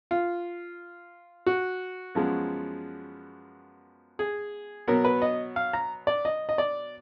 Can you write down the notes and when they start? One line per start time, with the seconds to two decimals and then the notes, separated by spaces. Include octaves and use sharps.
0.11 F4
1.47 F#4
2.15 F#2 F3 G#3 B3
4.19 G#4
4.88 B2 F#3 B3 A#4
5.05 B4
5.22 D#5
5.56 F5
5.73 A#5
6.07 D5
6.25 D#5
6.49 D#5
6.58 D5